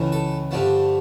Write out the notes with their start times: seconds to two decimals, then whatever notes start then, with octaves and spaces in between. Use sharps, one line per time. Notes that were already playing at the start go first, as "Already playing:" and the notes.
Already playing: C#2 C#3 E3 A3
0.12 A4
0.51 G2 D3 F3 A3